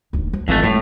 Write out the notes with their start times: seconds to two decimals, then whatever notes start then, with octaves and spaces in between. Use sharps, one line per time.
0.13 D1 D#2
0.33 F3
0.48 G#1 F2 E3 A3
0.64 A2 F3 G#3